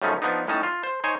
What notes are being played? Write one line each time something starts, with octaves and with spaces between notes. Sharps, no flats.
F#2 C#3 F3 A3 C#4 D#4
F3 B3 D4 D#4
A2 C#4 D#4 A5
F4
C5
D#4 C5 C#5 G#5